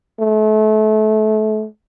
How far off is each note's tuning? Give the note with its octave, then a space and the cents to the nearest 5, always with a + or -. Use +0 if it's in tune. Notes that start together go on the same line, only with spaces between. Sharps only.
A3 -30